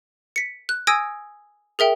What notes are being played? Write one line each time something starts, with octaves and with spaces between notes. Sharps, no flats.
B6 C#7
F#6
G#5 D#6 E6 G#6 A#6 D7
G#4 A#4 E5 G5